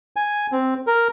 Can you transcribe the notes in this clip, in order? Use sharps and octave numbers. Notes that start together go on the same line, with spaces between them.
G#5
C4
A#4